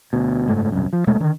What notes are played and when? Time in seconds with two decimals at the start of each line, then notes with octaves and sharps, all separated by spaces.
0.13 D2 B2
0.48 F#1 G#2 A3
0.72 D#1 C2 F#2
0.93 F3
1.07 D#1 B2 G#3 A3
1.20 D3 D#3